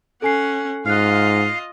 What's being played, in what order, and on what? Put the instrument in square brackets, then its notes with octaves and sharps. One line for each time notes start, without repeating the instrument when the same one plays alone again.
[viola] C#4 F#5 [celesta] A4 G#5 C7
[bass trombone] G#2 [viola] F4 D#5 [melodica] F5 [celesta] F6 F#6